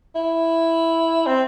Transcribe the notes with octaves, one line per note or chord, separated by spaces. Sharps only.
E4
C4